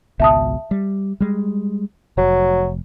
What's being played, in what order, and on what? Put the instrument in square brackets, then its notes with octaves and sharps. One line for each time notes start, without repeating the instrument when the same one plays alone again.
[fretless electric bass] G#1 C#2 B2 [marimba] E5 A5 D#6
[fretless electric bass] G3
G3 G#3
[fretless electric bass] F1 [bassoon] F#3